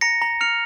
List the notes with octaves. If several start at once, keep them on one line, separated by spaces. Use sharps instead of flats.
A#5 A#6 C#7
A#5
F6 C#7 F7